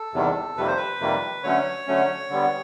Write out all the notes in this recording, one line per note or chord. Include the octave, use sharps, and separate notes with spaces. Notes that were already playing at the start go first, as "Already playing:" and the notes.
Already playing: A4
E2 C3 D#3 G3
F2 C3 D#3 G3 A#3 B4
C5
B4
F2 C3 D#3 G3 A#3
D3 F#3 A3 C#4 C#5
D3 F#3 A3 C#4
D3 G3 B3